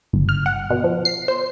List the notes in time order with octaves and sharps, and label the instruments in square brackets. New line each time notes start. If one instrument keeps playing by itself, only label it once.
[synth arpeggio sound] G1
F6
F#5
B2
F3
C7
C5